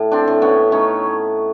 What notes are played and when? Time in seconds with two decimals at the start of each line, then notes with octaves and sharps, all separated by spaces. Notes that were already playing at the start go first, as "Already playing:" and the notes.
Already playing: A2
0.12 C4 D4
0.28 A2
0.42 B3 C#4
0.72 A3 C#4 D#4